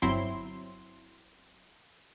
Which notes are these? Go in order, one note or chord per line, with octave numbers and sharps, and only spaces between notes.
G1 F#3 C4 E4 C6